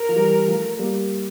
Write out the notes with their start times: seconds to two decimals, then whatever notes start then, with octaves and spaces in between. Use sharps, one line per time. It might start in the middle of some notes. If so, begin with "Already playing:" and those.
Already playing: A#4
0.09 F3
0.16 E3 G3
0.47 F3 A3
0.79 G3 A#3